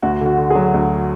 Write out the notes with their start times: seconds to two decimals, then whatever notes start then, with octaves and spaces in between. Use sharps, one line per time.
0.03 D2 F#4
0.21 D3
0.26 F#4
0.38 D3
0.50 F#3 G#4
0.74 D2